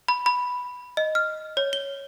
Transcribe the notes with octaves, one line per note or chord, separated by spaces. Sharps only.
B5
B5
D#5
F6
C#5
G7